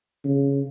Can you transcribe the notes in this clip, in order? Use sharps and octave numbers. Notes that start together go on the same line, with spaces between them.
C#3